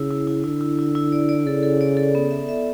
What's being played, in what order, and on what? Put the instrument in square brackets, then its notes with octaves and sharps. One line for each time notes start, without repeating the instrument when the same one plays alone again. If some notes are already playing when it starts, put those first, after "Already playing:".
Already playing: [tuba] C#3 [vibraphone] E4
[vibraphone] E4
E4
[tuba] D3 [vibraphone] E4
[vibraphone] E4
E4
E4
D5
D5
[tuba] C#3 [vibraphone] A4
[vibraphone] A4
D5
A4
B3
E5
E5